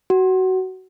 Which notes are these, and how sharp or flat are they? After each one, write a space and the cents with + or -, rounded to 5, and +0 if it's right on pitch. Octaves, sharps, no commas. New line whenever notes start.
F#4 +20